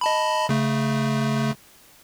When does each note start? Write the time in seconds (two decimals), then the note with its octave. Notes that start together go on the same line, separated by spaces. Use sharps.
0.01 D#5 A5 B5
0.49 C#3 A3